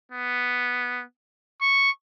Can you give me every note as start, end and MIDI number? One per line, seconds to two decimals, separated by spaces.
0.11 1.03 59
1.61 1.90 85